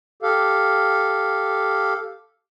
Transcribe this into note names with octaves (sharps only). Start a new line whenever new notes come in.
G4 A4 F5